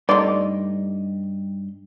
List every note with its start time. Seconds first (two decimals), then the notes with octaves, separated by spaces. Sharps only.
0.09 G2 A3 D#4 D5 C6